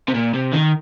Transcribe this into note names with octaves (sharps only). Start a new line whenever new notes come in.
C3
A#2
C3
D#3